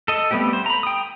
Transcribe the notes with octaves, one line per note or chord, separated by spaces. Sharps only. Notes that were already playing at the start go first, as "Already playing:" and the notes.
A4 D#5
G3 A3 B3 C4 G4
C5
A#5 B5
G5 D#6